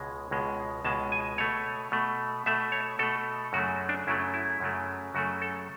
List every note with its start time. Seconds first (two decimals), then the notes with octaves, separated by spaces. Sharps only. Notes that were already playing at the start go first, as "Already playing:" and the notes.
Already playing: C#2 B2 G#3
0.31 C#2 B2 G#3
0.84 C#2 B2 G#3 A5
1.12 G#5
1.38 B2 A3 C#5
1.92 B2 A3
2.46 B2 A3 E5
2.72 C#5
2.99 B2 A3 A4
3.53 F#2 C#3 F#3 A3 F#4
3.89 D4
4.07 F#2 C#3 F#3 A3 E4
4.34 E4
4.60 F#2 C#3 F#3 A3
5.14 F#2 C#3 F#3 A3 F#4
5.42 A4